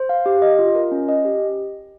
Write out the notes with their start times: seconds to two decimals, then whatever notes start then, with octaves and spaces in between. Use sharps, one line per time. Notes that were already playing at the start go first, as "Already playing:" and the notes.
Already playing: C5
0.09 F5
0.26 G4
0.42 D#5
0.59 F4
0.75 A#4
0.91 C#4
1.08 D#5
1.25 G4